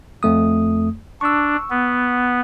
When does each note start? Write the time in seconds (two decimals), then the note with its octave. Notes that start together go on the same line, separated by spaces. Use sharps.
0.23 F2 A3 D#6
1.21 D4 C#6 E6
1.70 B3